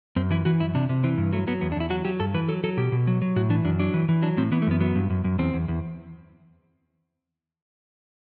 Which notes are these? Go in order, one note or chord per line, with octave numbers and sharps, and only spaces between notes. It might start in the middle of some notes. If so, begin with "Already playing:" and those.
F#2 C4
E3 E4
E3 F#4
F#2 E4
C3 D4
C3
E3 C4
G2
F#3 A3
F#3 B3
E2 B3
D4
E2 E4
F#3 F#4
F#3 G4
G2 A4
E3 B4
F#3 A4
F#3 A4
B2 G4
B2
F#3
F#3
A2 F#4
E3 D4
F#2 D4
F#3 D4
E3
E3
F#3 D4
A2 C4
E3 B3
A3
F#2 B3
F#3 B3
G2
F#2
F#2
E2 C4
E2
E2